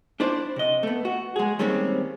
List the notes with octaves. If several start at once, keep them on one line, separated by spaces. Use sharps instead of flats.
D4 E4 C5 D5
C3 D#5
A3 B3
F#4
G#3 G#4
D#3 G3 G#3 A#3 C4 C#4